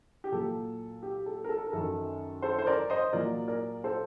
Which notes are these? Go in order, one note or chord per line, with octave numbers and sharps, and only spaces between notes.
G4
A#2 F#3 A4
G4
A4
A#4
A4
A#4
F#2 D#3 F#3 A4
A4 C5
C5
A#4 D5
C5 D#5
A#2 F#3 A#4 D5
A#4 D5
A4 C5